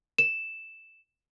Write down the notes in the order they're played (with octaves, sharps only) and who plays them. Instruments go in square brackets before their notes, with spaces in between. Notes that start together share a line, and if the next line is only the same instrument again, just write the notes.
[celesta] E7